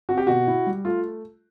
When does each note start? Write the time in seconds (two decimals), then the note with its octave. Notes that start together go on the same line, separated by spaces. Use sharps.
0.09 C4 F#4
0.18 G4
0.27 B2 F#4
0.47 E4
0.67 G3
0.85 A3 F4